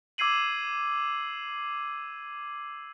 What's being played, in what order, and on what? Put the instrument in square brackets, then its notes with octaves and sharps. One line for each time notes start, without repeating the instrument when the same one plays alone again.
[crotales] D6 E6 G#6 C7 D#7 F#7